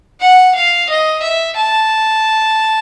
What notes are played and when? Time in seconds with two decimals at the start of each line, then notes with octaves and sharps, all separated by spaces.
0.21 F#5
0.55 F5
0.89 D#5
1.22 E5
1.57 A5